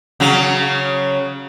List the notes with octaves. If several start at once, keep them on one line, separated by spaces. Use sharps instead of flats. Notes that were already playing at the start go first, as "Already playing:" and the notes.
C#3 F#3